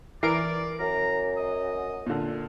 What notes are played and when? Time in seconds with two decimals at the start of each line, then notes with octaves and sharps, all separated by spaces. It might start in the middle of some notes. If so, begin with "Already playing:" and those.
0.23 E3 A#4 D5 C7 D7
0.80 F#2 A#5
1.37 D#5
2.07 A#2 D3